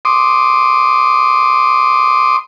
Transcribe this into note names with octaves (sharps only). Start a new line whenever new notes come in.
C6 D6 D#6